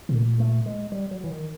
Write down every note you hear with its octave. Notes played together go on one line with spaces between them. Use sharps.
B2
A#2 A3
A3
G#3
G3
F#3
E3
D#3